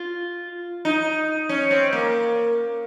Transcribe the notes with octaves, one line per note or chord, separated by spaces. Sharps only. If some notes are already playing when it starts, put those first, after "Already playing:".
Already playing: F4
D#4
C#4
C4
A#3